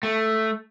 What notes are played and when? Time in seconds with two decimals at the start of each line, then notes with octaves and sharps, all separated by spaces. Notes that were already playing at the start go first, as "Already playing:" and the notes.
0.03 A3